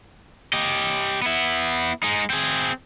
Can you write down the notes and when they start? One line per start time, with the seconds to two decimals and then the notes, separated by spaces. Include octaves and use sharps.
0.53 G4 D#5
1.22 B3 E4
2.03 G#3 D#4
2.30 C4 G#4